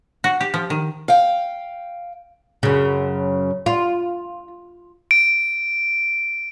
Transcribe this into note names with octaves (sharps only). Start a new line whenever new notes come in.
F#4
G4
F3
D#3
F5 G5
F#2 C#3
F4
D7